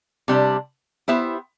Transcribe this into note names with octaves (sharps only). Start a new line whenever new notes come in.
C3 G3 D4
B3 E4 G4 C5 E5